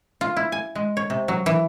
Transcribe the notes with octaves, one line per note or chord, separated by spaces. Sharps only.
F4
E4
G#5
G#3
C#5
C3
F#3
E3